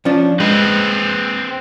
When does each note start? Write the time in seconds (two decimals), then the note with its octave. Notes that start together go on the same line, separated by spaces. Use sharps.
0.05 F3 C#4 D4
0.40 G#3 C4 B4